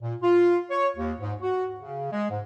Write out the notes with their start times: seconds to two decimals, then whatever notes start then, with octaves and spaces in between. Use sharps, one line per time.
0.02 A#2
0.22 F4
0.71 C#5
0.96 D#2
1.20 G#2
1.42 F#4
1.80 C#3
2.12 G#3
2.30 G#2